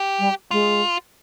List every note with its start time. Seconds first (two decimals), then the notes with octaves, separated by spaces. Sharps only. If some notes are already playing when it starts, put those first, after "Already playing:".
Already playing: G4
0.19 G3
0.51 G#3 F4